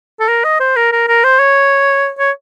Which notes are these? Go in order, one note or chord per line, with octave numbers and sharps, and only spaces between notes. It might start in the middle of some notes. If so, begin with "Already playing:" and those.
A4
A#4
D#5
C5
A#4
A#4
A#4
C5
C#5
C#5